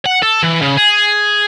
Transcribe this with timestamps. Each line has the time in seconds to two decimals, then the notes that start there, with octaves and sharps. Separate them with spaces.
0.06 F#5
0.22 A4
0.43 E3
0.62 C#3
0.77 G#4